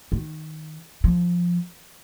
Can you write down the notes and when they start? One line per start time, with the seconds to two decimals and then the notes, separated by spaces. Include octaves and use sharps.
0.12 D#3
1.04 F3